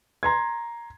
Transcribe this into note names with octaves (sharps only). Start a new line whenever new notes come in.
A#5 C6 G#6